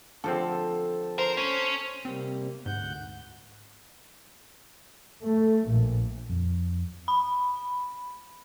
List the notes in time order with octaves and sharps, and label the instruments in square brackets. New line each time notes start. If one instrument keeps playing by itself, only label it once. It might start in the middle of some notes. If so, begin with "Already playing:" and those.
[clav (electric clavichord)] D3 F3 C4 [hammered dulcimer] A4
[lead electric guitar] A#4 [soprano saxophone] C5
[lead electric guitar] C#4
[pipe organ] C3 G3 A#3 [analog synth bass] C4
[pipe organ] D2 F#5 G6 [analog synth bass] G#2
[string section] A3
A#1
[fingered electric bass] F2
[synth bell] B5